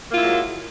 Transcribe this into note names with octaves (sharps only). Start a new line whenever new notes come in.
F#3 G#3 A#3 E4 F4